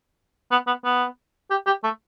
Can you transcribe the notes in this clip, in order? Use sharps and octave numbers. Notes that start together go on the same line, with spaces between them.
B3
B3
B3
G4
G4
A3